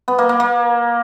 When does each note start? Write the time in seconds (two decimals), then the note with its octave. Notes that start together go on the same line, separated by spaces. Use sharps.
0.08 B3
0.19 A#3
0.29 A#3
0.40 A#3